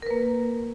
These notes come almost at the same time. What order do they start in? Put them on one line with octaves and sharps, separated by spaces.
A#4 B4 A#3